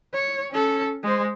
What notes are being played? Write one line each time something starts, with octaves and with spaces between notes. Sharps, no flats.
C#5
C#4 A4
G#3 C5